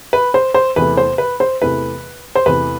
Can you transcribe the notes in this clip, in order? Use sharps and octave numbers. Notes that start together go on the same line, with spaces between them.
B4
C5
C5
E2 C3 E3 A3 B4
C5
B4
C5
E2 C3 E3 A3 B4
C5
E2 C3 E3 A3 B4